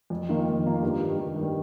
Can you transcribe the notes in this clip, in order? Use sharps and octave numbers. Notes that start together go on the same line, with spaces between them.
F2
D#3 A#3 F4
F2
D#3 A#3 F4
G2
D#3 G3
G2
D#3 G3